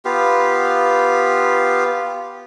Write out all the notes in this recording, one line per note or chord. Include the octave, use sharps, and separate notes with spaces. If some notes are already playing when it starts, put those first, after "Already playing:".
B3 F4 G4 F5